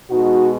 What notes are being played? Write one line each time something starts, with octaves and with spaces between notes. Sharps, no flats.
B2 G#3 D#4 F#4